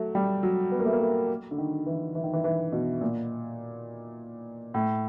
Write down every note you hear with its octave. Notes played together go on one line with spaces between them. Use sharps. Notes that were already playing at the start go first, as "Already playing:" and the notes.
Already playing: F#3 A3
G3
F#3
B3
A#3
A3
A#3
A3
D3
D#3
E3
E3
D#3
E3
E3
B2
A#2
A2